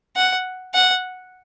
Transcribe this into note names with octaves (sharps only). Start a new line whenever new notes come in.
F#5
F#5